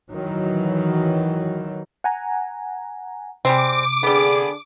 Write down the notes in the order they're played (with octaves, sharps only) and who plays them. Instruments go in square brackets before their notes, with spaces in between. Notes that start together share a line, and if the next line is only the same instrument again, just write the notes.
[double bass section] D#3 E3 F#3
[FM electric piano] F#5 G#5 A#5
[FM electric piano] C3 [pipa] G3 G#3 C4 [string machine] D6
[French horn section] D3 D4 G#4 [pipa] G3 B3